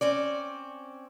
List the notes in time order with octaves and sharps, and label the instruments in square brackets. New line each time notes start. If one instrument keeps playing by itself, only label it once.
[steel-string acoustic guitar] C4 C#4 D5